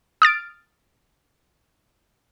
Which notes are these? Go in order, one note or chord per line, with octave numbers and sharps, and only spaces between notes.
D#6 F6 A6 D7